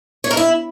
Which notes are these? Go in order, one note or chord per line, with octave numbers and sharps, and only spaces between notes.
C#5
A#4
E4